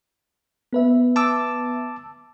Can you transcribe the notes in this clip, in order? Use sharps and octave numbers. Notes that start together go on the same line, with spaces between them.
B3 B4 E5
A5 D6 E6